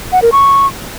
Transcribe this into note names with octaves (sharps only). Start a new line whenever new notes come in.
F#5
A#4
C#6